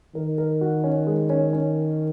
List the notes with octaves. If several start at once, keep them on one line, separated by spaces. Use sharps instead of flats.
D#3 A#4
A#4
F#4
C#4
G#3
C#4
C#4